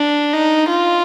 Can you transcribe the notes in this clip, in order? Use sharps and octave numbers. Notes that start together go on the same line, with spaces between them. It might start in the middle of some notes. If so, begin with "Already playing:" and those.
Already playing: D4
D#4
F4